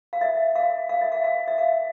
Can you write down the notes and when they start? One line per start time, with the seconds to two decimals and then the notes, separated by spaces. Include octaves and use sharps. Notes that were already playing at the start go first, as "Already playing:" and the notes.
0.13 F5
0.21 E5
0.55 F5
0.89 F5
1.01 E5
1.12 F5
1.24 F5
1.48 E5
1.58 F5